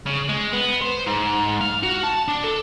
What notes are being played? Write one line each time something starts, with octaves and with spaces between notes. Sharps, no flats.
C#3
G#3
B3
C5
G#2
F5
F#4
A5
D4
A4